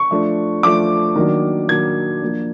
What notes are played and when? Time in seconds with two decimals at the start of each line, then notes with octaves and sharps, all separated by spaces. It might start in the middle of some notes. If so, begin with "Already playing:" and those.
Already playing: C#6
0.11 F3 A3 D4
0.63 F3 A3 D4 D6
1.16 D#3 F#3 A#3 D4
1.69 D#3 F#3 A#3 D4 G#6
2.21 F3 A#3 D4